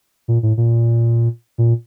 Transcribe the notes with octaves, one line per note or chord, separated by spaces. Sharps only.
A#2
A2
A#2
A#2